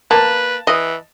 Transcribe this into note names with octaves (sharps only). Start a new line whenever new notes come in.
A#3 B4 A5
E3 D#5